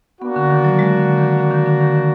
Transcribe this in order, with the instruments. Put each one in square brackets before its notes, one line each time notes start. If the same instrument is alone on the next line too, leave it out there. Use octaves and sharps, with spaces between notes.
[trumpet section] A#3 D4 F#4 [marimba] B3
[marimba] D3
D#3
F#3
G#3
D3
D#3
D3
D#3
D3
D#3
D#3